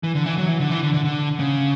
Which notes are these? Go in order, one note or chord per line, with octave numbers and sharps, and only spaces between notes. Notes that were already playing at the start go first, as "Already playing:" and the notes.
E3
D3
E3
F#3
E3
D3
E3
D3
D3
D3
C#3